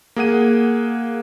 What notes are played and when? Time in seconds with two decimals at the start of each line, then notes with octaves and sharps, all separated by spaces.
0.16 A#3 G#4 F#5 D#7